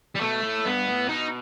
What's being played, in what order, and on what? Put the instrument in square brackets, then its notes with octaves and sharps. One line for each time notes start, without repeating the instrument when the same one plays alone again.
[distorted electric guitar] G3
[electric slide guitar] B2 [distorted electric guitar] A3
[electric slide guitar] A2
[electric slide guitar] G2 [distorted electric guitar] B3
[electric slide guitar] A2
[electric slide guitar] B2 [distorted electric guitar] D#4